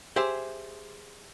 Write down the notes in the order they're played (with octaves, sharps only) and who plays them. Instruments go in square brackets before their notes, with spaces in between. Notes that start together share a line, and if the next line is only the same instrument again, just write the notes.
[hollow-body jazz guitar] G4 G#4 C5 E5